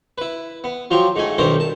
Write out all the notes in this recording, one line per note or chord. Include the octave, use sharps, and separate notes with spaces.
E4 B4
B3
F3 F#3 F4 G4
G#2 A3 G#5
B1 G2 D#3 A#4 C5 C#5
A5